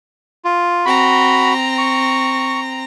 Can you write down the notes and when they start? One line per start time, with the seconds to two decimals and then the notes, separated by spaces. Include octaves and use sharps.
0.45 F4
0.86 C4 F#4 A#5 B5
1.78 C#6